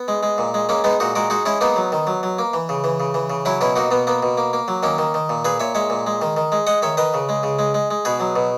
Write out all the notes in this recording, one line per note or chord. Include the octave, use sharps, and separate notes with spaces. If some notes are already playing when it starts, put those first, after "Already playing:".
Already playing: B3
G#3
G#3
A#2
G#3
G#3 A#3 C#4
G#3 B3 D#4
A#2 D#4 F#4
G#3 F#4 A#4
G#3 D#4 F#4
G#3 C#4 E4
A#3 B3 D#4
F#3
D#3
F#3
F#3
A#3
E3
C#3
E3
C#3
E3
C#3
F#3 C#4 E4
B2 C#4 E4
A#3 D#4 F#4
B2 B3
A#3 B3
B2
A#3
A#3
F#3
D#3 A#3 C#4
D#3
D#3
A#2
A#2 G#4 B4
A#2 C#5 E5
G#3 C#5 E5
A#2
G#3
D#3
D#3
G#3
G#3 D#5 F#5
D#3 C#5 E5
D#3 B4 D#5
C#3
G#3
C#3
G#3
G#3
G#3
B2 G#4 B4
F#3
B2